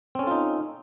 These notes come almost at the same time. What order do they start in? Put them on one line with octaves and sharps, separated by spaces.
C4 C#4 A4 F4 D#4